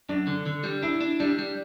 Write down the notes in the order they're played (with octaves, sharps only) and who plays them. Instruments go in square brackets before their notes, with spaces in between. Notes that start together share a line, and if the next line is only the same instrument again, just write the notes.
[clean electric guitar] F#2 [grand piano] D4
[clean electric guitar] D3
D3
G3
[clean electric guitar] D4 [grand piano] E4
[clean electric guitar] D4
[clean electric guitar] G3 [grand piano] D4
[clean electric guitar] G3